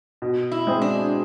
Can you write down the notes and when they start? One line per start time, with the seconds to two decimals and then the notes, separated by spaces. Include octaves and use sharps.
0.22 B2
0.52 E4
0.67 G#3 C4 G#4
0.82 D4